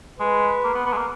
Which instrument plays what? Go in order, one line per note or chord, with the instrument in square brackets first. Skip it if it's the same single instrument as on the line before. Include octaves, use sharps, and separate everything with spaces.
[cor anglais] G#3 [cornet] B4
[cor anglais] A#3
B3
B3
G#3
A#3